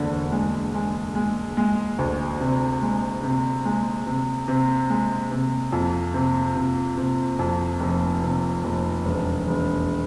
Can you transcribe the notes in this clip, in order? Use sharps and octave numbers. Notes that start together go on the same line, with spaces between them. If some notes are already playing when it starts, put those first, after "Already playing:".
Already playing: E1 D2 D3
G#3
G#3
G#3
G#3
D2
C3
G#3
C3
G#3
C3
C3
G#3
C3
F2
C3
C3
C3
F2
F1
C3
F1
E1
E1